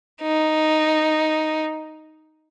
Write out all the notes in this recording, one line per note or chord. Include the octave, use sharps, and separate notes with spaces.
D#4